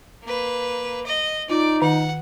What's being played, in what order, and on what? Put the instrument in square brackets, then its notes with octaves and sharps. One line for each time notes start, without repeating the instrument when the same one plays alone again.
[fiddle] A#3 B4
D#5
[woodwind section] D#4 [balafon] F4 [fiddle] D5
[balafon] D#3 [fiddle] F#5